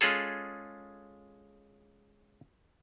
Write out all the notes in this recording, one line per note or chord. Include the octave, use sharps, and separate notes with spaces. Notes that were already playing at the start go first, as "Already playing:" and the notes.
G#3 C#4 F4 G#4 A4